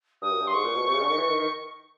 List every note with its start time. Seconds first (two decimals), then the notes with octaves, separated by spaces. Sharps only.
0.21 G2 D#6
0.31 F#2
0.40 G2
0.47 C6
0.53 G#2 C#6
0.64 A#2
0.75 B2
0.86 C3
0.94 C#3
1.01 D3
1.09 D#3
1.18 E3
1.29 D#3
1.39 D#3